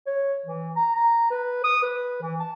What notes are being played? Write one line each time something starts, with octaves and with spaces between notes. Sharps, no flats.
C#5
E3
A#5
A#5
B4
D#6
B4
E3
A5